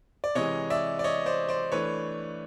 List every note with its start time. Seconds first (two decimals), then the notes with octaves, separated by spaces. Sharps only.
0.24 D5
0.35 C3 E3 G#3 C#5 D#5
0.70 D5 E5
0.99 D5
1.04 C#5 D#5
1.26 C5 D5
1.49 C5 D5
1.72 E3 A3 D4 B4 C#5